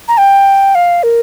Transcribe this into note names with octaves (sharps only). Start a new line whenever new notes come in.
A#5
G5
F5
A#4